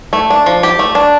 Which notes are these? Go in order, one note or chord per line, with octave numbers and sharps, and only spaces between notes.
A3
D4
F3
G4
A3
D4